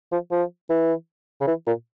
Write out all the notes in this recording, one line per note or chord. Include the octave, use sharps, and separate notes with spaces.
F3
F3
E3
C#3
E3
A#2